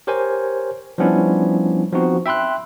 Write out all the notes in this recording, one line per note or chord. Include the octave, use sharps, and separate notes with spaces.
G4 A#4 C5 C#5 G#5
F3 G3 B3 C#4 D4 E4
F3 B3 C4 D#4 F#4
E5 G5 B5 C6 F#6